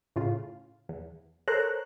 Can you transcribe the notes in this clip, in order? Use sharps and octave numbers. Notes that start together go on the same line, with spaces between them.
A2 C#3 F4
E2
A4 A#4 C5 C#5 A#5 F#6